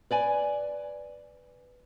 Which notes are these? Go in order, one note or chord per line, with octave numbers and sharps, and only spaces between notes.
B4 D5 G#5